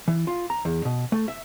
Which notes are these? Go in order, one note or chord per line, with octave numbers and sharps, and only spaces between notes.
E3
F4
A#5
E2
B2
A3
E5